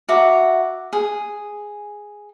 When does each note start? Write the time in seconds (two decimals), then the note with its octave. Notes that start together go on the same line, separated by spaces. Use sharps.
0.09 F#4 E5 A#5 D6
0.93 G#4